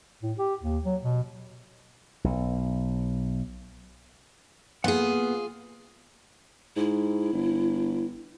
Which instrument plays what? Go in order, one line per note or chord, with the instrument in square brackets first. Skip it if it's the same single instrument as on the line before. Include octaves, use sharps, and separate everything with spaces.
[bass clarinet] A2
G4
D#2
F#3
B2
[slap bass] B1
[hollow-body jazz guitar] A#3 B3 F#5 [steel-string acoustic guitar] F4 G#4
[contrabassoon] G#2 [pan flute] E4
[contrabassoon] G1